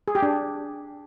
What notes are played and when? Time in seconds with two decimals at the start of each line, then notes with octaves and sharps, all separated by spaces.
0.08 G#4
0.15 G4
0.22 D4